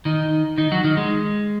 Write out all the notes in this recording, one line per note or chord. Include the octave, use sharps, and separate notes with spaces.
D#3 D#4
D#3 D#4
F#3 F#4
D#3 D#4
G#3